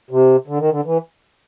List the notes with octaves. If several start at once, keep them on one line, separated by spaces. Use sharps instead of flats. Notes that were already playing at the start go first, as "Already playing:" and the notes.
C3
D3
D#3
D3
E3